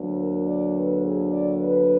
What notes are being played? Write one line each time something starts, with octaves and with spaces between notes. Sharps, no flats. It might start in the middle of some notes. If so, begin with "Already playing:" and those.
Already playing: D2 D3 F#3 A#3
A#4
D5
B4
G#4
D5
B4